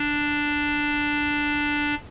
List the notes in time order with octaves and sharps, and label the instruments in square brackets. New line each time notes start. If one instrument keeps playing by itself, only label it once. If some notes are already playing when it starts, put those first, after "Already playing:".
Already playing: [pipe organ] D4